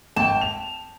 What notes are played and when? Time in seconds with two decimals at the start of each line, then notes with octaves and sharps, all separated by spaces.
0.16 G#1 G5 A5
0.41 F7